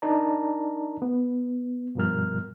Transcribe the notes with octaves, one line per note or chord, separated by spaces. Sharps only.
D4 D#4 A#4 D5 A5 A#5
B3
G2 B2 F3 G3 A#4 F6